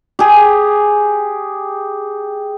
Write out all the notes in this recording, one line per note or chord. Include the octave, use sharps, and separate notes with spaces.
G4 G#4